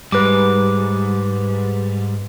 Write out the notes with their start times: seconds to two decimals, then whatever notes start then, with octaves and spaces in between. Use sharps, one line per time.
0.12 G#2 G3 B4 D6